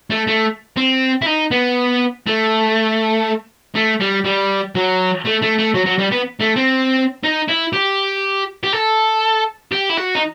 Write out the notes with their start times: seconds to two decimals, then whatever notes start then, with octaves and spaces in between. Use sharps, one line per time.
0.10 A3
0.27 A3
0.76 C4
1.22 E4
1.26 D#4
1.51 B3
2.27 A3
3.76 A3
4.01 G3
4.25 G3
4.75 F#3
5.25 A3
5.42 A3
5.58 A3
5.74 F#3
5.86 F#3
5.99 G3
6.12 B3
6.41 A3
6.57 C4
7.24 D#4
7.49 E4
7.73 G4
8.64 G4
8.73 A4
9.72 G4
9.90 E4
9.97 F#4
10.15 D#4